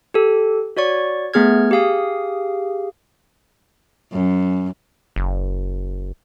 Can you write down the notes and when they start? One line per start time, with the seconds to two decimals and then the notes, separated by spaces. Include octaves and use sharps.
0.14 G4 A4
0.77 F#4 C#5 D5 C#6
1.34 A3 B3 G#4 F6 G#6
1.71 G4 G#4 F5 D#6
4.13 F#2
5.16 F#1